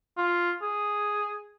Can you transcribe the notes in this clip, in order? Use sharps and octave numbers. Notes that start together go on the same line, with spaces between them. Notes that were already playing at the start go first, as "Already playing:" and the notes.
F4
G#4